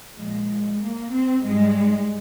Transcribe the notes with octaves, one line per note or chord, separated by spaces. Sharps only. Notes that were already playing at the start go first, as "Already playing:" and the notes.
A#2 F3 G#3
A#3
C4
G#2 G3 G#3